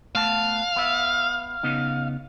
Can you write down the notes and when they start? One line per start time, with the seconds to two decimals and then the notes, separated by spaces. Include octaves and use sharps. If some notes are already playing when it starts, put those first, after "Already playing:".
0.15 A3 B3 F5 A5
0.76 B3 E5
1.63 C#3 B3 D#4